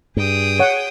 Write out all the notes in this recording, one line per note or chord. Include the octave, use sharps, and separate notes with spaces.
G2 G#4 G5 D#6
C#5 F#5